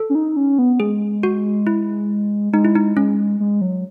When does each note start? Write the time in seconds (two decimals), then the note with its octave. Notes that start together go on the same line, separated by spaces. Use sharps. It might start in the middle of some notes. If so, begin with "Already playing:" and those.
Already playing: A4
0.10 C#4
0.15 D#4
0.36 C#4
0.59 B3
0.80 G#3 G#4
1.23 F#4
1.67 E4
2.53 G#3 D#4
2.65 E4
2.75 D#4
2.97 G#3 C#4
3.40 G#3
3.61 F#3